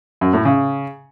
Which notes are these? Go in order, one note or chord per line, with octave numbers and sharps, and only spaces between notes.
F#2
A2
C#3